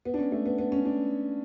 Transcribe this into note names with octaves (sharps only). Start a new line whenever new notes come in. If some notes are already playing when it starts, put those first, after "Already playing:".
B3
D4
C#4
A3
B3
B3
C#4
D4